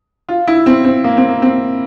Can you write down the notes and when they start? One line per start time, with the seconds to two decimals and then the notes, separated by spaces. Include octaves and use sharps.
0.29 F4
0.47 E4
0.66 C4
0.85 C4
1.04 A#3
1.17 C4
1.29 A#3
1.42 C4